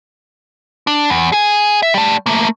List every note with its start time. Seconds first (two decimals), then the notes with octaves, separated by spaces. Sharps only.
0.87 D4
1.10 E2
1.32 G#4 G#5
1.83 E5
1.94 G3 A3
2.26 A3 A#3